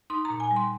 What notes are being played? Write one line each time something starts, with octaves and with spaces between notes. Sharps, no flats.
D#4 C6
A#5
A#2
G#5
G3
C6